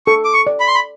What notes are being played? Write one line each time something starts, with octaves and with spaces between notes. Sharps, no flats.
A4 C#6
D6
C#6
D5
B5
C6
B5